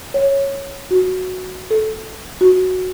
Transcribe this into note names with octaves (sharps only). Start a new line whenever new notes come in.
C#5
F#4
A4
F#4